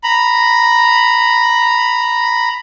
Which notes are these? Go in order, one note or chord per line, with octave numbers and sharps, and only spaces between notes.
A#5 B5